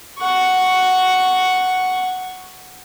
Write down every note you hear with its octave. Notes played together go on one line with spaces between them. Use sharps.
F#5 C#6